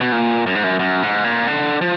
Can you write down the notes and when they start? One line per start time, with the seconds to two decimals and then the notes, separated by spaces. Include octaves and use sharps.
0.01 B2
0.12 A#2
0.46 F#2
0.55 G#2
0.64 F#2
0.79 F#2
1.03 G#2
1.24 A#2
1.47 D3
1.81 F3